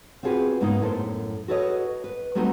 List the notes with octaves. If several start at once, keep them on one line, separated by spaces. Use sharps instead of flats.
C4 F4 F#4 G#4 A#4 B4
G#2 C#3 A#3 B3 D#4
F#2 A2 E4 A4 A#4 C5
F#4 G#4 A4 B4 C#5 D#5
B4
F#3 G3 A3 C4 D#4 F#4